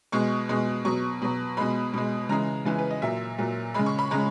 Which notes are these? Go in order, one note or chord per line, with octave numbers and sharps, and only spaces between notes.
B2 G#3 C#6
B2 G#3
B2 F#3 C#6
B2 F#3
B2 G#3 B5
B2 G#3
C#3 E3 G#3 A#5
C#3 E3 G#3 G#5
B4
D#5
A#2 F#3 E5
A#2 F#3
C#3 G#3 B5
C#6
B5
C#3 G#3 A#5